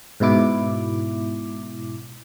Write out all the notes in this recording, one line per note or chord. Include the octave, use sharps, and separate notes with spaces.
G#2 B2 E4 D6